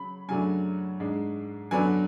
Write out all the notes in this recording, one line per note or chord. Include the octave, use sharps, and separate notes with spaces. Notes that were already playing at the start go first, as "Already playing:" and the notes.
Already playing: C#3 F#3 C#4 B5
F#2 C#3 F#3 A3 D4 G#5
G#2 G#3 D4
F#2 D3 F#3 B3 D4 G#5